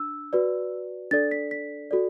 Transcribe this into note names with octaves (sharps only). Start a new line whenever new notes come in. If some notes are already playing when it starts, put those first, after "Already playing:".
Already playing: D4 E6
F#4 B4 D5
D4 A4 D5 A6
B6
B6
F#4 A4 D5